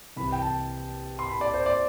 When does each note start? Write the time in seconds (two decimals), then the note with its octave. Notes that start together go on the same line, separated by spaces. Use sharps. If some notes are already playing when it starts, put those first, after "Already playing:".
0.17 C2 C3 E3 B5
0.32 G5
0.42 A5
1.19 C6
1.29 B5
1.41 D5
1.54 C5
1.66 D5